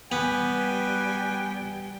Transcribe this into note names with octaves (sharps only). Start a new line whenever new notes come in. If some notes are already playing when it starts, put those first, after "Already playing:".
G3 B3 G4 B4 G5 G#5